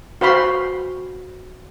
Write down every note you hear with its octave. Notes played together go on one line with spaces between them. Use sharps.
F#4 C5 F5 B5 C6